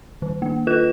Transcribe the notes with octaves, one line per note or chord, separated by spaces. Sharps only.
D#3
A#3
F4 B4 F#6 E7